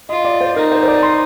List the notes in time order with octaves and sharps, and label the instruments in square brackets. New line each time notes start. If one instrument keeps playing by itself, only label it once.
[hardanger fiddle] F4 [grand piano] D#5
[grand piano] D5
C5
[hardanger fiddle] D#4 [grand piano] A#4
[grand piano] C5
C5
D5
C6